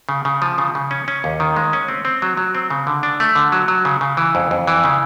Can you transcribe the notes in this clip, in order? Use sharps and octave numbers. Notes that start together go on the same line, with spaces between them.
C#3
C#3
F3
C#3
C#3
C#4
C#4
D#2
D#3
G#3
C#4
C4
C4
F#3
F#3
C4
C#3
D3
D4
A3
D3
F#3
F#3
C#3
C#3
E3
F2
F2
E3
C#3